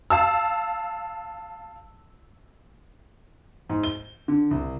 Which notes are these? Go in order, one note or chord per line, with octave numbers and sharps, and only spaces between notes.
F5 A5 E6
G#2
G7
D3
C2